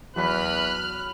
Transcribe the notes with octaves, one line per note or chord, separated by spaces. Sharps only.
E2 F#3 B4 B5 F6 F#6 B6